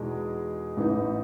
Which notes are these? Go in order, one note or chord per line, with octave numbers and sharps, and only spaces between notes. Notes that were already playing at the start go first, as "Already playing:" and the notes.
Already playing: E2 B2 G#3 D#4 G#4
A1 G#2 E3 B3 D#4